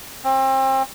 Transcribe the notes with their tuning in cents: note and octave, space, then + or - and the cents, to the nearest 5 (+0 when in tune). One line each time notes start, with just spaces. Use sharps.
C4 +35